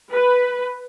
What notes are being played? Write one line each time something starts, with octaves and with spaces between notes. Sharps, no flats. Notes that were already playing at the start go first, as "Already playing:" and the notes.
B4